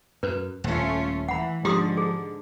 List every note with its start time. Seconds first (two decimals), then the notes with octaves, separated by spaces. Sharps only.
0.23 F#2 B4
0.64 D#1 A3 C#4 F4
1.28 E3 F#5 B5
1.65 G#2 D3 F3 G4 C6 D#6
1.97 G#4